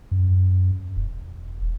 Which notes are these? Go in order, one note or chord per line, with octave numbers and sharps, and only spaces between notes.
F#2
E1